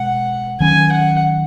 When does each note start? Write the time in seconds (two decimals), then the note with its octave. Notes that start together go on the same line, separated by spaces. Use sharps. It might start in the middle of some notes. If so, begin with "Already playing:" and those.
Already playing: B2 G#3 F#5
0.60 D#3 F#3 C#4 G#5
0.92 F#5